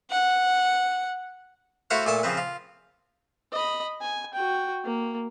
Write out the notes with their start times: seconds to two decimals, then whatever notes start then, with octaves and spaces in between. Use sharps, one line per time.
0.11 F#5
1.90 A3 E4 F#4 C5 F5 F#5
2.06 A#2 A3 G#5 A5
2.23 C#3 F3 C4 B4
2.37 F4
3.53 D#5 B5
4.01 G#5
4.34 F#4 G5
4.84 A#3